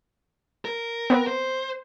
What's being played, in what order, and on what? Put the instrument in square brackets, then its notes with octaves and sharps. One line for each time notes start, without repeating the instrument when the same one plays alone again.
[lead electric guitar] A#4
[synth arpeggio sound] B3 C4 B4
[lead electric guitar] C5